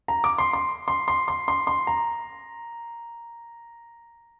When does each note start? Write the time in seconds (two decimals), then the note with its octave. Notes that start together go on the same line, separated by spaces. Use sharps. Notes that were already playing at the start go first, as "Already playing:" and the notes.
0.08 A#5
0.24 D6
0.38 C6
0.53 C6
0.88 C6
1.08 C6
1.28 C6
1.48 C6
1.67 C6
1.87 A#5